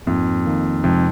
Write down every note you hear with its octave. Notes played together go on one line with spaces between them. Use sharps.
F2 G#2 F3 A#3 D#4
D#3 A#3 D#4
F2 C3 F3 G#3 D#4